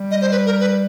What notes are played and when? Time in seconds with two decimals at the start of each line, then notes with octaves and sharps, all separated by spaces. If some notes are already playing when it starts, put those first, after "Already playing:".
Already playing: G3
0.11 D#5
0.21 C5
0.31 B4
0.46 A#4
0.60 B4